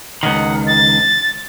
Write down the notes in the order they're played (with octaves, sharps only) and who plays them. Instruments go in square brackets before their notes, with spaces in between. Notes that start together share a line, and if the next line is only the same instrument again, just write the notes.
[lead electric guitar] C#2 D#3 [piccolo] F#5
[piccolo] A6